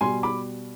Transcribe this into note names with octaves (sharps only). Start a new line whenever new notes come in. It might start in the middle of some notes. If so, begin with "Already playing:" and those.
B2 G3 G#5 C6
B5 D6